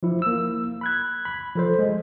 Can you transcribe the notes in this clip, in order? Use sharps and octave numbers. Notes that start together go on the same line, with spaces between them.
F3 E4
A#3 E6
B5 F#6 G#6
B5
F3 A4 C5
G#3